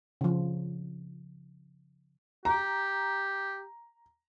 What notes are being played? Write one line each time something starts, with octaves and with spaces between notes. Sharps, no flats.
C#3 F3
G4 A#5